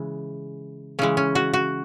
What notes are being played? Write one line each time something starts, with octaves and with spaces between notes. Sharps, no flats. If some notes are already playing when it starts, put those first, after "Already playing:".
Already playing: C#3 E3 G#3
C#3 E3 G#3 C#4
C#4
F#4
F#4